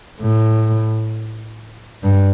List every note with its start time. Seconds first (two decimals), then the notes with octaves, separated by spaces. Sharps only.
0.21 A2
2.03 G2